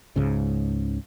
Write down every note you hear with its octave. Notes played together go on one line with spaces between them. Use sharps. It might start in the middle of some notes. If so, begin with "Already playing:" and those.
C#2 G#2 C#3